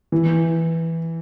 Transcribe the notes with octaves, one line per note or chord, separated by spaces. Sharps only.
E3